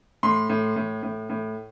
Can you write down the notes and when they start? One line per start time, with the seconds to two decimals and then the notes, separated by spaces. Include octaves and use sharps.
0.23 A2 C6
0.49 A2
0.76 A2
1.03 A2
1.30 A2